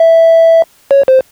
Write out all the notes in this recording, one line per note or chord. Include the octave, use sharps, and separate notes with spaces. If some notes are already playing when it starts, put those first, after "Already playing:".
Already playing: E5
C#5
C5